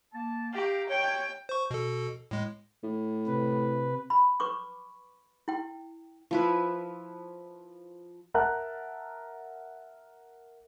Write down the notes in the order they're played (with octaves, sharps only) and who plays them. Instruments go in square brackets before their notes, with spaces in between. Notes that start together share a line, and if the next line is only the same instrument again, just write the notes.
[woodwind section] A#3 A5
[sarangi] G4 [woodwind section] F5 G5 A#5
[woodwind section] C#5 [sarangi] G5
[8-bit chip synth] C5 C#6
B2 A4
A2 G#3
[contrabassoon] A2
[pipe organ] C3 B4
[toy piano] B5
B4 C#6 D6
E4 G5
[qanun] F3 E4 B4
[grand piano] A#4 E5 F#5 A5 A#5 F#6